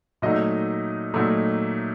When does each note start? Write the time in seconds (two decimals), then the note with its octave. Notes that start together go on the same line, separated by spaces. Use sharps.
0.22 A#2 F#3 A3 D#4 D#5
1.14 A#2 F#3 A3 D#4